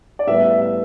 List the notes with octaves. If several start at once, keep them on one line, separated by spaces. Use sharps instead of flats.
D5
A2 G3 B3 E5
E5
E5